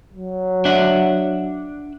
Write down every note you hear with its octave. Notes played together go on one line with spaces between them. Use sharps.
F#3
D4 E5 F#5